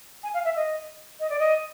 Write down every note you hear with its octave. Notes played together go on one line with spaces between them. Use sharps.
G#5
F5
E5
D#5
D#5
D5
D#5